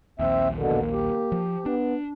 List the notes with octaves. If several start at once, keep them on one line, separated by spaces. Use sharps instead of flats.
A#1 D#2 C4 E5
B2 D3 A#3
G4
F3
B3 D4